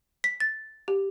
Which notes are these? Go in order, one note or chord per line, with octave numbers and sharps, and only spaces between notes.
B6
A6
G4